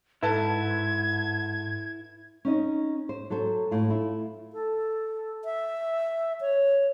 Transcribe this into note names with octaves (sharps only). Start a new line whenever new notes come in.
G#2 E4 A4 B4 A5 G#6
C#4 D#4 D#5
C5
F#3 A4 C5
A2 F4
E4 F4
A4
E5
C#5